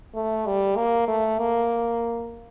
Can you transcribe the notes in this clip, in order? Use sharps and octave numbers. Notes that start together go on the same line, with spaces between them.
A3
G3
A#3
A3
A#3